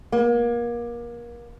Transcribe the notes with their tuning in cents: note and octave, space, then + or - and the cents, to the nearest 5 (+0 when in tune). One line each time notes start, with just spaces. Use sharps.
A#3 +30